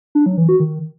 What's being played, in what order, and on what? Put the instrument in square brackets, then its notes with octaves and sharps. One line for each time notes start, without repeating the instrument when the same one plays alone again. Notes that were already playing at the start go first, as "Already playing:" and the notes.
[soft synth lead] D4
F#3
E3
F#4
D#3